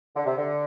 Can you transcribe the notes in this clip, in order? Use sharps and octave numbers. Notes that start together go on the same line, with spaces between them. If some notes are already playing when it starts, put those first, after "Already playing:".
D3
C3
D3